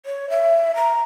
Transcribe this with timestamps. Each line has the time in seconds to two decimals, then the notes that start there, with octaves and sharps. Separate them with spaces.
0.06 C#5
0.30 E5
0.76 A#5